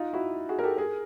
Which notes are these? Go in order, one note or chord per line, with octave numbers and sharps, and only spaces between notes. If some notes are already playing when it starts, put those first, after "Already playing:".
Already playing: D#4 F4
E4 F#4
F#4 G#4
A#4
G4 A4
G#4 A#4